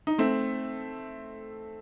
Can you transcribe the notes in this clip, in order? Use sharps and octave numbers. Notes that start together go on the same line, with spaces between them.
D#4
A3 C4